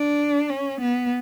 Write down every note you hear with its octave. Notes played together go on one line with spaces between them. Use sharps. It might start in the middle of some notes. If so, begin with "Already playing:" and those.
Already playing: D4
C#4
B3